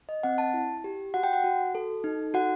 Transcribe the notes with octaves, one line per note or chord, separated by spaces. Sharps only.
D#5
C4 F#5
A5
E4
G4
F#4 F#5
G5
F#5
F#4
A4
D#4
F#4 F#5